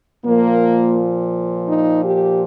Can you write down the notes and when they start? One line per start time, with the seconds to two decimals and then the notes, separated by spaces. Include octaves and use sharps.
0.25 A#2 F3 A#3
1.69 D#4
2.05 G4